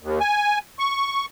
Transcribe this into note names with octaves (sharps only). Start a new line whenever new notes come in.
D#2
G#5
C#6